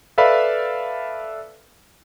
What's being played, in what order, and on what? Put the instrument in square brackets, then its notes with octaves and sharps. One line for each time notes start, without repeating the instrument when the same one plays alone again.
[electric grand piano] A4 B4 D5 E5 F5 B5